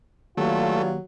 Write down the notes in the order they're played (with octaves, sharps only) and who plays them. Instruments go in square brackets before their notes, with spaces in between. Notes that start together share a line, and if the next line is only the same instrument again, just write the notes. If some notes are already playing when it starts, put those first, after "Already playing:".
[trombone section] G2 F4 [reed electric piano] D#3 A#3 G4 [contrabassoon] F#3 [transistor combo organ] A3